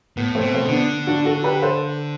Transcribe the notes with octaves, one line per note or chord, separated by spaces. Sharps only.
A2 B3
A3 C4
B2
A3 C4
D3
B3 D4
D4 F#4
F#4 A4
G4 B4
A4 C5